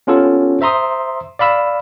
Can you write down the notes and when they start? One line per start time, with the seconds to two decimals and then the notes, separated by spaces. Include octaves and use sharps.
0.07 B3 C#4 F4 G4 A4
0.61 C5 E5 A#5 C6 D#6
1.39 D5 F5 B5 E6